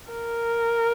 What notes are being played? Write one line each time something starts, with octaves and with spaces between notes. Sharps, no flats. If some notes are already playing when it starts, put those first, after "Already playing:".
A#4